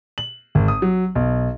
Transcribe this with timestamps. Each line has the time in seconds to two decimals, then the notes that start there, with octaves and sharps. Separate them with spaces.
0.18 F#7
0.55 G#1
0.68 D#6
0.82 F#3
1.15 B1